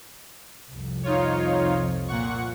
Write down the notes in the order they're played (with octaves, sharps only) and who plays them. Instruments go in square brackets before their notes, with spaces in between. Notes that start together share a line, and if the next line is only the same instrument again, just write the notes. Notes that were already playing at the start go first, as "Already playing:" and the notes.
[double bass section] C2 F2
[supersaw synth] D#4 F4 C#5
A#2 F#5 C#6